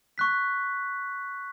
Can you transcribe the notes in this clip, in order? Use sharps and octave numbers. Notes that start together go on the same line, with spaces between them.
C#6 F#6 B6